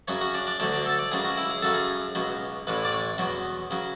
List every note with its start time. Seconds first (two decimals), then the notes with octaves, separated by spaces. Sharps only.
0.08 F#2 C#3 F#3 C#5
0.21 F#4
0.34 D4
0.47 D4
0.60 D2 D3 F#3 D4
0.73 D4
0.86 A4
0.99 D5
1.11 C#2 C#3 F#3 G#4
1.25 F#4
1.37 E4
1.50 G#4
1.62 F#2 C#3 F#3 A4
1.74 G#4
2.15 C#2 B2 F#3
2.67 A1 A2 E3 B4
2.85 D5
2.92 C#5
3.18 E2 B2 F#3
3.71 C#3 F#3